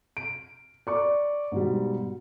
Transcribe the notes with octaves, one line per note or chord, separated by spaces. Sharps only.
D7
D5 C#6 D6
G#2 B2 G3